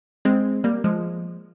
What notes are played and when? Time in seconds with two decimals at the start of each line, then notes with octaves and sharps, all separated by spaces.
0.25 G#3 C4
0.64 G3 A#3
0.84 F3 G#3